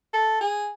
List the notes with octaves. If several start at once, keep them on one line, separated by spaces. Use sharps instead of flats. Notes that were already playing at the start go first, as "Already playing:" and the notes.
A4
G#4